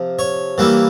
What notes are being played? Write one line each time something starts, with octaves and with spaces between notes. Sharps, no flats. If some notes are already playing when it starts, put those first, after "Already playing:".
Already playing: C3 F3
C#5
E3 G3 A#3 E4